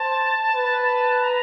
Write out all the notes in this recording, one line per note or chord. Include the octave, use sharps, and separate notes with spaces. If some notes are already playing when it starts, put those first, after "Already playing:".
Already playing: C5 A5
B4
A#5